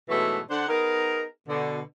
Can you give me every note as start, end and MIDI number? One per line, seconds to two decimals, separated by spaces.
0.09 0.40 44
0.09 0.40 47
0.09 0.40 52
0.09 0.40 54
0.09 0.40 57
0.09 0.40 68
0.50 0.66 50
0.50 0.66 62
0.50 0.66 72
0.50 0.66 78
0.68 1.24 59
0.68 1.24 63
0.68 1.24 68
0.68 1.24 70
1.49 1.80 47
1.49 1.80 50